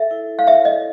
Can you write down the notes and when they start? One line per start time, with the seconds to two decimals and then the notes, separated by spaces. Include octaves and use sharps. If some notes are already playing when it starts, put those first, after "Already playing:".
Already playing: A4 E5
0.11 E4
0.39 F5
0.47 C#5 E5
0.65 D#5